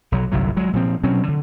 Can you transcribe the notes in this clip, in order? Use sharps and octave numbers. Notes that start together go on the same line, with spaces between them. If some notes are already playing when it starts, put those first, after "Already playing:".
B1 F#3
G1 C2 A2 F#3
F#3 G#3
A#2 F3 C4
B2 F#3 C4 C#4
D3